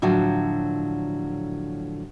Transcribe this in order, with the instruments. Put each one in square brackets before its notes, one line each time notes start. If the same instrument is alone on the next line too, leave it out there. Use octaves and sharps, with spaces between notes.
[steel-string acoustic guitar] A2 D3 F3 F#3